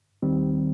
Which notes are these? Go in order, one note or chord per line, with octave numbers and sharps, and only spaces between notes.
D#2 D#3 G3 C4